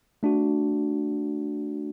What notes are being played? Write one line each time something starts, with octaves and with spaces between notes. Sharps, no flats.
A3 D4 F#4